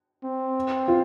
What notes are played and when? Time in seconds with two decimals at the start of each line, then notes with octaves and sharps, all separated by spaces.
0.24 C4
0.88 F4